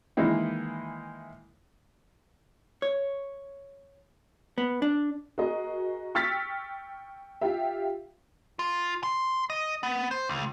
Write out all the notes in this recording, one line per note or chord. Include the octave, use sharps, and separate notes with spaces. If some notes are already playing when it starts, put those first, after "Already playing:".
D#3 E3 G#3 A#3 D#4 E4
C#5
B3
D4
F#4 G#4 A#4 D#5
G5 C#6 E6 F6 A6 B6
F4 G4 E5
F4
C6
D#5
B3
C5
C#2